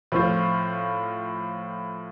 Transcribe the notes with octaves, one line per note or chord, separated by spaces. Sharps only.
A2 F3 C4 F4